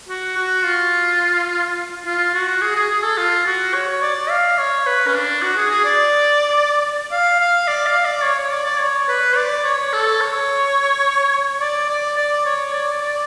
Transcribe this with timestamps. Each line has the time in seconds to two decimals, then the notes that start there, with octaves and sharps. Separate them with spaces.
0.09 F#4
0.37 F#4
0.64 F4
2.05 F4
2.34 F#4
2.61 G#4
2.75 G#4
2.90 G#4
3.04 A4
3.17 F4
3.46 F#4
3.74 C#5
4.02 D5
4.30 F5
4.58 C#5
4.86 B4
5.07 C#4
5.15 D4
5.42 F#4
5.57 G#4
5.71 G#4
5.84 D5
7.11 F5
7.40 F5
7.67 D5
7.86 F5
8.05 D5
8.24 C#5
8.38 C#5
8.52 D5
8.66 D5
8.79 C#5
9.08 B4
9.36 D5
9.64 C#5
9.93 A4
10.21 C#5
11.60 D5
11.89 D5
12.17 D5
12.46 C#5
12.73 D5
13.02 D5